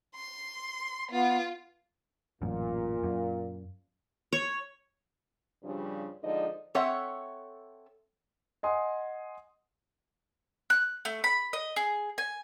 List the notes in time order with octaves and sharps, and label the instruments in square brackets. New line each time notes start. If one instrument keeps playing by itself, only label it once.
[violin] C6
[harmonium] B3 [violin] F4
[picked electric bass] A1 F#2 [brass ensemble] A#2
[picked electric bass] F#2
[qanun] C#5
[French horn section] G2 C#3 F3 G3 D4 F4
D3 F3 G#3 D#4 D5 D#5
[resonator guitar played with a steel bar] C4 A4 C#5 E5 F#5
[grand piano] D#5 F#5 G#5 C6 D#6
[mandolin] F#6
A3
B5
D#5
G#4
G#5